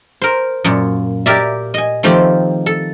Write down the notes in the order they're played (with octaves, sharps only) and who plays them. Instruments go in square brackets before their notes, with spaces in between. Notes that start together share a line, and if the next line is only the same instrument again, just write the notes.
[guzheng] A#4 C5
F#2 A#2
G4 A#4 D5 E5
D#5 G#5
D#3 F3 A3 C4 G4
A4